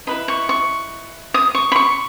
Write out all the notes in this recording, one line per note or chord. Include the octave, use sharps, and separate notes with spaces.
E4 B4 D#5 B5
C#6
C#6
D#6
C#6
B5
C#6